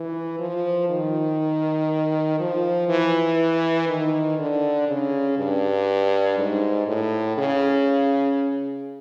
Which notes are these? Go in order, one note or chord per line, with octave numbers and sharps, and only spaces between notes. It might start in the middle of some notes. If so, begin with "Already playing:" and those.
Already playing: E3
F3
D#3
F3
E3
D#3
D3
C#3
G2
G#2
A2
C#3